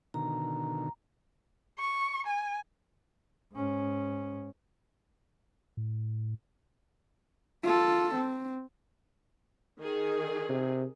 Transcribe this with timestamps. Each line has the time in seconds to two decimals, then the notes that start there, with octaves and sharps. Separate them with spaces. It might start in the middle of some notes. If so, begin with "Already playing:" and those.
0.14 B2 D3 D#3 A#5
1.79 C#6
2.27 G#5
3.53 G#2 C#4
5.77 A2
7.63 F4 A4
8.15 C4
9.80 D#3 G#4
10.49 C3